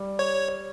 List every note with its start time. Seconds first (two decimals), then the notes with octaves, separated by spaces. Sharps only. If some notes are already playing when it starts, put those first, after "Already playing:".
Already playing: G3
0.19 C#5